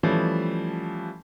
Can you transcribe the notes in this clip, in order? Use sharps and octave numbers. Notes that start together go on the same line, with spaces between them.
E3 F3 G3 A3 C#4